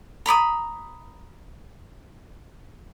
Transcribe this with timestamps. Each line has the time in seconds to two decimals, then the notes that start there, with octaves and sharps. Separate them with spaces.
0.26 A#5 B5 D6 D#6